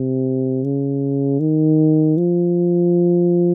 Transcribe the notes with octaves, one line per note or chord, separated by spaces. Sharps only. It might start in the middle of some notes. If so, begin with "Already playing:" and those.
Already playing: C3
C#3
D#3
F3